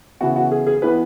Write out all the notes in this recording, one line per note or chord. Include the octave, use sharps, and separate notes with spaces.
C#3 E3 B3 E4 F#4
F#4
G#4
G#4
E3 B3 B4